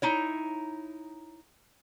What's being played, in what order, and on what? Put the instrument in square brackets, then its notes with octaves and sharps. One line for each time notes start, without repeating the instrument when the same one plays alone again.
[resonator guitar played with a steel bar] D#4 E4 C#5